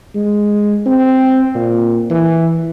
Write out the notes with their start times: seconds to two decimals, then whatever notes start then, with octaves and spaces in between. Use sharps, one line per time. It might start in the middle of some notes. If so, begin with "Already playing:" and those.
0.15 G#3
0.86 C4
1.55 A#2
2.10 E3